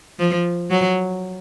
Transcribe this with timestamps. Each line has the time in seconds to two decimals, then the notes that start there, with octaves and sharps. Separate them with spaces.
0.19 F3
0.70 F#3